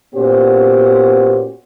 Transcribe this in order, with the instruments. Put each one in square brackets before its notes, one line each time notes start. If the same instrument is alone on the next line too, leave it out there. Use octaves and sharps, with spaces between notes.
[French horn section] A#2 B3 C#4 F#4 G4 C5